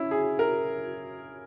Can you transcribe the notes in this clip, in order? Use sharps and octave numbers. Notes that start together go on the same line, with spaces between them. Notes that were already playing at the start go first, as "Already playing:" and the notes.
Already playing: C#4 E4
G#4
A#4